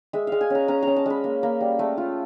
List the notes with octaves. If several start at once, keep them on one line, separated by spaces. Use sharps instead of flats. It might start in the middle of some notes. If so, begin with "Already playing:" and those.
G#3 E5
G#3 F5
G#5
C#4 A#5
C#4 A#5
C#4 A#5
A5
G#3 B5
A#3
A#3
G3
A3
F4